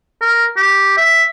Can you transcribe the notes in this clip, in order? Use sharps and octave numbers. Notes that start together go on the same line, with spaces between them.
A#4
G4
E5